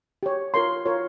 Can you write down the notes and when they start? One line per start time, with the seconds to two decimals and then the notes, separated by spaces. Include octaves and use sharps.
0.23 G4 C#5
0.54 F4 A#4 C#5 C6
0.86 F4 A#4 C#5